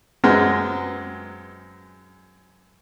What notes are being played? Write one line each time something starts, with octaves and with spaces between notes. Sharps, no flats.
F#2 F#3 G#3 B3 C4 F6